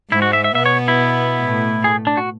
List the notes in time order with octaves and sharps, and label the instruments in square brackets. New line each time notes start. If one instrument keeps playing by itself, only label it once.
[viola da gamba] G#2 G#3 [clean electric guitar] E4
[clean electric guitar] F#4
E5
E5
[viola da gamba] B2 B3 [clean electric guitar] E5
[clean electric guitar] C#5
E4
[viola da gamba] A2 A3
[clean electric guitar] G#4
D4
F#4